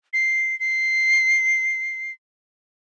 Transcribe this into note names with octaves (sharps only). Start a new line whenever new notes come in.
C7
C7